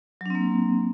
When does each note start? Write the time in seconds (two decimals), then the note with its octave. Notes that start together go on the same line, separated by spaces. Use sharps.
0.21 F#3
0.26 D4
0.30 C4
0.35 A#3